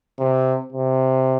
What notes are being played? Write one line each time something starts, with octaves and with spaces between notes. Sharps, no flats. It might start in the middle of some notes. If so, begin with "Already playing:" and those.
C3
C3